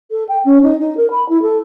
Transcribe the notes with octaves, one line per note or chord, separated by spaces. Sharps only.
A4
G5
C#4
D#4
D#4
A#4
B5
E4
A4